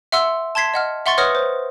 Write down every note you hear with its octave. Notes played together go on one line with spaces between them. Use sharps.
E5 F#5 C6 E6
A5 C6 G#6 B6 C7
D#5 F#5 F6
E5 F#5 C6 C#6 A6 C#7
B4 C#5 F#5 D#6 F6 A#6
C5